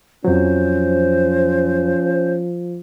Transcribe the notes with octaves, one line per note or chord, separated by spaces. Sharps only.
F2 F3 F#3 C#4 C5